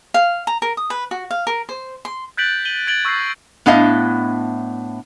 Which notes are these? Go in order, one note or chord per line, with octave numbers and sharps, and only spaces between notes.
F5
A#5
A#4
D#6
B4
F#4
F5
A#4
C5
C6
F#6 G6 A6 B6 D7 F#7
D#7 F#7 G7
G#6 A6 D7 F#7 G7
C#6 E6 G6 A6 A#6 C7
A2 B3 D4 E4 D#5 F5